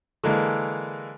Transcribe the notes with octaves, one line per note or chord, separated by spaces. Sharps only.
D3 E3 G#3 A#3